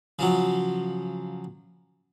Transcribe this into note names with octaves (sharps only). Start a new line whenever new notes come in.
C#3 F3 F#3